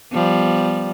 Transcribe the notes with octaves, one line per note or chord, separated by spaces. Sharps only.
F3 G3 B3